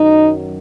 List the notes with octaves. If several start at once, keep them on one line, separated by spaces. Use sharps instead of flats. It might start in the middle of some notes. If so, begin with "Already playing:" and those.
Already playing: F#2 D#3 F#3 D#4